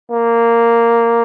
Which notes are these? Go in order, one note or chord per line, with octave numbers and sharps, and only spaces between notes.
A#3